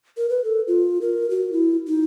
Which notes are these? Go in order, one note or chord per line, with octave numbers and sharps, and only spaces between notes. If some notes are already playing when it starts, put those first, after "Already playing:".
A#4
B4
A4
F4
A#4
F#4
E4
D#4